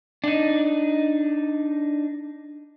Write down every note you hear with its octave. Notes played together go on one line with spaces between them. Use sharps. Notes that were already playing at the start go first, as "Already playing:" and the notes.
D4 D#4